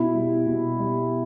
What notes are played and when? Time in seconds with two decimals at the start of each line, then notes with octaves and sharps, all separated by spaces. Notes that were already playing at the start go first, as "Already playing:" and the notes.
Already playing: B2 E4
0.15 G3
0.47 B2
0.80 G3